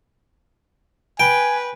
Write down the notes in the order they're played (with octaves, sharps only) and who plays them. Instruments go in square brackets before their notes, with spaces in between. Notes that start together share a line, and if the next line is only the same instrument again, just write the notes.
[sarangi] B4 [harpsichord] G5 [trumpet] G#5